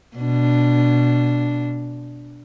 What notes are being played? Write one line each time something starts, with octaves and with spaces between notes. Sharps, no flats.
B2 D4